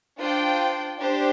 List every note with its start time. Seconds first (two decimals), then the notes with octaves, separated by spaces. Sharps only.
0.19 D4 F4 C5 G5
1.00 D4 G4 C5